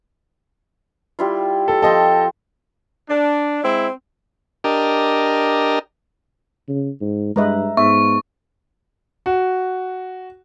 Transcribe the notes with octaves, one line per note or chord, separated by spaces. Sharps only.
G3 E4 F4
A4
F3 C4 A4 D#5
D4
G#3 C4 E4
D4 G4 A#4 D#5
C#3
G#2
G2 G#3 B4 D#5 E5 A#5
G#2 B3 E5 C#6
F#4